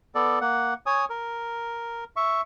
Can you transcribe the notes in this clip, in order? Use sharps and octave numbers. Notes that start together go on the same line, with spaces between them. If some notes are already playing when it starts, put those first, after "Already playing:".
B3 A4 D5
A#3 F#5
C#5 G#5 D#6
A#4
E5 C#6